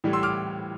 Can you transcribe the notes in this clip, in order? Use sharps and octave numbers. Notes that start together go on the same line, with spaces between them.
A2 E3 G3
C6 E6
D6 F6